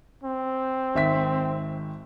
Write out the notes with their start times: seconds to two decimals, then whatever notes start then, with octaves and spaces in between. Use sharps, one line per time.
0.24 C4
0.95 G#1 E5 B6